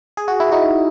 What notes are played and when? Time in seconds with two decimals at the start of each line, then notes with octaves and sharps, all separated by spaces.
0.17 G#4
0.28 F#4
0.40 E4
0.52 D#4 F#4